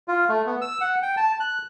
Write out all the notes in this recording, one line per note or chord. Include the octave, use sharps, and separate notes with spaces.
F4
A3
B3
E6
F#5
G5
A5
F#6